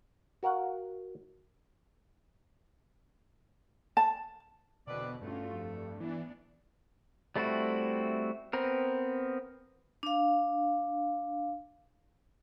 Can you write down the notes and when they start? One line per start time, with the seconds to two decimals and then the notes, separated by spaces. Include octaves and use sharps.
0.43 F#4 A#4 F5 F#5
3.97 A5
4.87 E2 B2 D3 E3 C4 B4 D5
5.21 G2 A3 C#4 F4 F#4
5.50 F2
6.00 G#2 E3 B3 D4
7.36 G3 A3 C4 E4 F#4
8.53 B3 C4 A#4
10.03 D4 F5